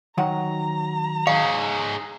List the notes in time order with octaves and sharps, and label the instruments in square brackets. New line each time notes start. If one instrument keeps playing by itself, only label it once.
[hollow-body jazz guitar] D#3 F#3 F#5 [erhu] A#5
[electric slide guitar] D#4 G#4 C#5 [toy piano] F5